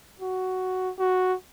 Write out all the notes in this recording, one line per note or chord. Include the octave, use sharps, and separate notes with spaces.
F#4
F#4